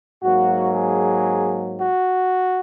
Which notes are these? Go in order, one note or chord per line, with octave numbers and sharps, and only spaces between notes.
G#2 F#3 A#3 F#4
G#4
F#4